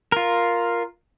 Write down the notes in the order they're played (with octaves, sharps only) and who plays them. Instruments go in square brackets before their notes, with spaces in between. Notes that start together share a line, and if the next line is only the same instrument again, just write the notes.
[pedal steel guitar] F4 A#4